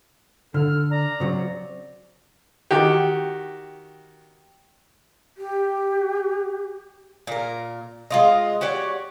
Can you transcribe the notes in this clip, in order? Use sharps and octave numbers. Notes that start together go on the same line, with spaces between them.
D3 A4 F6
D5 A#5
C#3 F#3 C4
D#3 F#4 G4
G4
A#2 A#4
G#3 F4 D#5
F#4 G4 C#5 D5